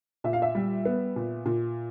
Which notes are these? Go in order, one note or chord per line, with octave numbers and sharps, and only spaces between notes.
A#2 E5
F5
E5
G3
B3
A#2
A#2